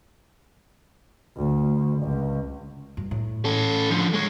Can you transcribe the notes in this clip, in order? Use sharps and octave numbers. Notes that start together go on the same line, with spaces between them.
D2
C#2
G2
A2
C#4 A4
D3 F3
G#3 C#5